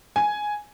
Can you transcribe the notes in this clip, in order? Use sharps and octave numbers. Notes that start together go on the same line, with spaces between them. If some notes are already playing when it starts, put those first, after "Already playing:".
G#5